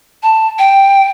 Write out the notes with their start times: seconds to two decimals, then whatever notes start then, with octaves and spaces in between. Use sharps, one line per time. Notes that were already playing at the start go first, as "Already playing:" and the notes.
0.23 A5
0.59 G5